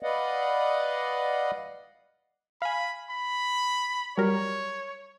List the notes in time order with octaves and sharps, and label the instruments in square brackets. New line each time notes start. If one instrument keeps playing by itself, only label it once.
[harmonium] B4 D5 D#5 F5 F#5
[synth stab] F5 G#5 [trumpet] B5
[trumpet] B5
[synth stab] F#3 G3 A#4 [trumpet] C#5